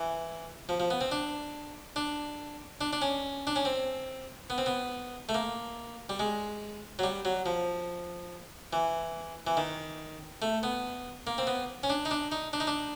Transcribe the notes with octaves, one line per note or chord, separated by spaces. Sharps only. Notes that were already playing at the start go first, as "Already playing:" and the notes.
Already playing: E3
F3
F3
B3
C4
D4
D4
D4
D4
C#4
D4
C#4
C4
B3
C4
B3
A3
A#3
G3
G#3
F#3
G3
F#3
F3
E3
E3
D#3
A3
B3
A#3
C4
B3
C#4
D4
D#4
D4
D#4
D4
D#4
D4